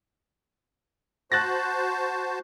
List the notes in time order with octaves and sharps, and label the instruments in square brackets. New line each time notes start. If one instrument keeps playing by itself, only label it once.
[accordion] F#4 C5 A5 [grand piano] F#6 A6 A#6